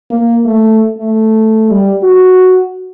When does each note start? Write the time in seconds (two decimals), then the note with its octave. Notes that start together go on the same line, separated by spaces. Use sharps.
0.10 A#3
0.45 A3
0.98 A3
1.71 G3
2.03 F#4